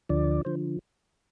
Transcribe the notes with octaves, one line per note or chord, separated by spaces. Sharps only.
D2 D3 F3 D5
D3 F3 C5